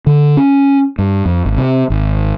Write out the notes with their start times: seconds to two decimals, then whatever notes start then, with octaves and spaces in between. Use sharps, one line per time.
0.07 D3
0.37 C#4
0.98 G2
1.25 F2
1.45 G#1
1.57 C3
1.90 G#1